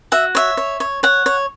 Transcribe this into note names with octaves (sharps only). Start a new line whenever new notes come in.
F#4 E5
C#5 E5
C#5
C#5
C#5 F#5
C#5